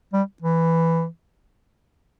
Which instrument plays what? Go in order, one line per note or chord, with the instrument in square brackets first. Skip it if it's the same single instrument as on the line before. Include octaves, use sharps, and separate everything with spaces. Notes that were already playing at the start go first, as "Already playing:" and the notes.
[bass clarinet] G3
E3